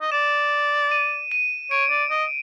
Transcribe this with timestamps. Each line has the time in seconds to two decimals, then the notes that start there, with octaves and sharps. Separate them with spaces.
0.01 D#5
0.12 D5 E7
0.91 D#7
1.32 D#7
1.71 C#5 D7
1.90 D5
2.10 D#5